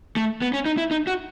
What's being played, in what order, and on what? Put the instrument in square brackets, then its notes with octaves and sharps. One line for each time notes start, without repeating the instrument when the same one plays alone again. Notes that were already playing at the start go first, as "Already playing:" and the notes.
[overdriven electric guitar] A3
B3
C#4
D#4
E4
D#4
F#4